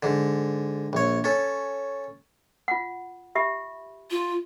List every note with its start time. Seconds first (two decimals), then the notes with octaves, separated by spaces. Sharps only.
0.03 G#2 D3
0.93 A#1 C#5
1.24 C#4 A4
2.68 F4 F#5
3.35 G4 E5 B5
4.11 F4